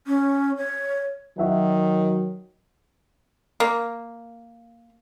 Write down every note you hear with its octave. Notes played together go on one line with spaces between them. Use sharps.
C#4
C#5
D#3 F#3 F#4 E5 F#5
A#3